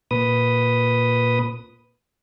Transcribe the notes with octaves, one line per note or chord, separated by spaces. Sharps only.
A#2 B4 D#6